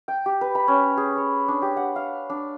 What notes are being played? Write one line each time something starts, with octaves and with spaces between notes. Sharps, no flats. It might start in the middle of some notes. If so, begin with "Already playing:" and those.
G5
G4
B4
B5
C#4
G#4
C#5
D4
G4
F#5
F5
D4